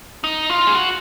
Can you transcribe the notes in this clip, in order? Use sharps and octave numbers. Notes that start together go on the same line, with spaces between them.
D#4
F4
G#4
F#4